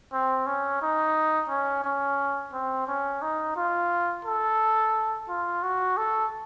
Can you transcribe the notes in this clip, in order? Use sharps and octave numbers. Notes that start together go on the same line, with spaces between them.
C4
C#4
D#4
C#4
C#4
C4
C#4
D#4
F4
A4
F4
F#4
A4